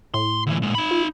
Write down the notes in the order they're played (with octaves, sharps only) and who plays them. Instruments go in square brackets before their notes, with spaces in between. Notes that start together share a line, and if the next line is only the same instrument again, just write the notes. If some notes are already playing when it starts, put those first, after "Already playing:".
[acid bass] A2 [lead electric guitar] C6
[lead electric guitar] D2 E3
A#2 G#3
D#4 B5
[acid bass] F4